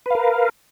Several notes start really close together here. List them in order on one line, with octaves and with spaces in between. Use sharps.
B4 F5 A#4